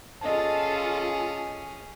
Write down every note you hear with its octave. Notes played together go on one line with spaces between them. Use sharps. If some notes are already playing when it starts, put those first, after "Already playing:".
C#4 F4 G#4 A4 D#5 F5 A5